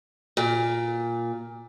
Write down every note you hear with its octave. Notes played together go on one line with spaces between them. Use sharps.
A#2